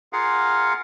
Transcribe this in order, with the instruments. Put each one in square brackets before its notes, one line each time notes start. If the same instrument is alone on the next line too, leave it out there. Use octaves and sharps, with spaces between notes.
[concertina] F4 G#4 A#4 F5 F#5